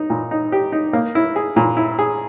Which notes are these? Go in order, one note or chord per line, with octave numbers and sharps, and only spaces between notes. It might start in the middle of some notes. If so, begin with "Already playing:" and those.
Already playing: D#4
A#2
D#4
G4
D#4
A#3
E4
G#4
A#2
E4
G#4